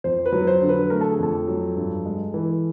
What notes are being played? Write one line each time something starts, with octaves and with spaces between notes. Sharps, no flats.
F2 C5
B4
F#3
C5
D3
B4
A3 A#4
A4
G#4
F2 A4
F#3
G2
G#3
E3